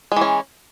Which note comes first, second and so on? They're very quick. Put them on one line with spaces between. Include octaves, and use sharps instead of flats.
G#3 E3 C#4